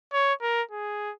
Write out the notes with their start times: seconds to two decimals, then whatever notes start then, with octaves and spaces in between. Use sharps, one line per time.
0.13 C#5
0.42 A#4
0.71 G#4